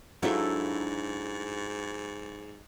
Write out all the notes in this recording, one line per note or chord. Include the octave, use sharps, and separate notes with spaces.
G#2 F#3 D4 E4 F4 A4